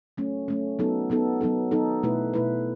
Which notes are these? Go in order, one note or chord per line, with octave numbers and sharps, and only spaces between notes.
F#3 A3 C#4
F#3 A3 C#4
F#3 B3 D#4 A4
F#3 B3 D#4 A4
F#3 B3 D#4 A4
F#3 B3 D#4 A4
B2 A3 E4 B4
B2 A3 E4 B4